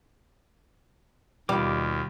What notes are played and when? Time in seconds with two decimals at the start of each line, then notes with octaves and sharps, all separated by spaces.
1.49 D#2 B2 G3 F4 D5 D6